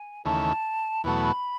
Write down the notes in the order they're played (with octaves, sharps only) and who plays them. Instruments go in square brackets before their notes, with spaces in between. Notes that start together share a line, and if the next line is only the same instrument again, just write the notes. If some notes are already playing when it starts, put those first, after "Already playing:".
Already playing: [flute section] G#5
[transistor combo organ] D#2 C#3 E3 A3 [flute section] A5
[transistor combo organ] E2 B2 F#3 A3 [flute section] B5